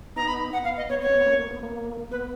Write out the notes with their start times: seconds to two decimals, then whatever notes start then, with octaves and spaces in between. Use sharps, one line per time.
0.16 B3 D#4 A#5
0.28 B5
0.53 F#5
0.64 B3 F5
0.77 D#5
0.89 B3 C#5
1.01 C#5
1.09 C#4
1.14 B3
1.26 A#3 C#4
1.39 A#3
1.51 B3
1.63 A#3
2.11 B3 B4